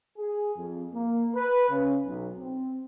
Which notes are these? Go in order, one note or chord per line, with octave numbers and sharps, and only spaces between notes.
G#4
F2
A#3
B4
C#3
B1
C4